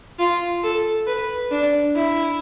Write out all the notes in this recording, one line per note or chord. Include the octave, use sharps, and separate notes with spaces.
F4
A4
B4
D4
E4